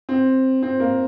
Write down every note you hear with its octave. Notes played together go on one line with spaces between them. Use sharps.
C4
C4
A#3